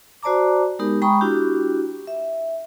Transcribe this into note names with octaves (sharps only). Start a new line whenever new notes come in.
F#4 C5 D5 A5 A#5 D6
G#3 B3 D#4 G4 A#4
G#3 G5 A#5 B5 C#6 D#6
D4 E4 F#4 G4
E5